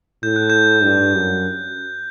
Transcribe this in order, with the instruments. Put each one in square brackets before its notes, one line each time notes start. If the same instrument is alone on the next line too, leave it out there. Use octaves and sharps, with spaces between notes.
[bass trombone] A2 [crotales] G6
[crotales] F#6
G6
[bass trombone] G2
F#2